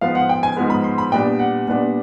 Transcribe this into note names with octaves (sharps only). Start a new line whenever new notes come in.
G#2 F3 G#3 B3 F5
F#5
G5
G#5
G#2 F3 G#3 B3
B5
C6
B5
A#2 G3 B3 D4 G5
F#5
A#2 G3 B3 D4